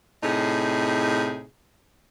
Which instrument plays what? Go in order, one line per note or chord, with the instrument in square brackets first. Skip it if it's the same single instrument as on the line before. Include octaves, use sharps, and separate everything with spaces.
[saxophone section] A2 C3 D#4 G#4